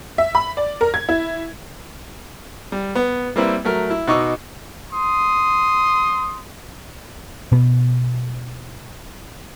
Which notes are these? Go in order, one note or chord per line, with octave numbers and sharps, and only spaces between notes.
E5
B5
D5
A#4
G#6
E4
G3
B3
G3 A#3 C4 E4 B4
F#3 A3 A#4
E4
B2 D#4 C#6 D6 E6
C6 D#6
B2 B3